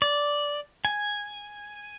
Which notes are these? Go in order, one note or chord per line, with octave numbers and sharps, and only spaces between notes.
D5
G#5